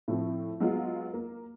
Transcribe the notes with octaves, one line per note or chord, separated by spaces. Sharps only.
A2 F3 C4
F#3 G#3 B3 F4
A#3